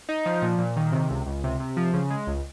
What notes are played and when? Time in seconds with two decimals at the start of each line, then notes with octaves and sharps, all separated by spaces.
0.09 D#4
0.26 F3
0.42 A#2
0.58 A#2
0.77 D#3
0.92 C3
1.10 C#2
1.26 C#2
1.44 C3
1.60 C3
1.77 F3
1.93 C#3
2.10 G#3
2.27 C#2